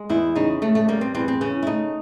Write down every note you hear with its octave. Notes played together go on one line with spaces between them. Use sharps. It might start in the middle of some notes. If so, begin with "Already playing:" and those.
Already playing: G#3
E2 E4
C#3 D#4
C#3 A3
A3
G3 A#3
C4
E2 C4
C4
C#3 C#4
E4
A3 D#4